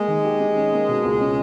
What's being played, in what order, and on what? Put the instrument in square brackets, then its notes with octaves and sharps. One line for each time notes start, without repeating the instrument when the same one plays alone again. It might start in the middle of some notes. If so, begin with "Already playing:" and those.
Already playing: [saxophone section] G#3 [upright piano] A#3
[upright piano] D#3
G4
D#4
C#4
A#3
B2
C#2
C#4